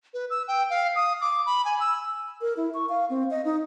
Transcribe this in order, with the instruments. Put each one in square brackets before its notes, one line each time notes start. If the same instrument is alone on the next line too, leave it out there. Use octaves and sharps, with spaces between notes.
[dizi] B4
E6
G5
F5
D#6
D6
B5
G#5
E6
[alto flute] A#4
E4
C#6
F5
C4
D#5
D#4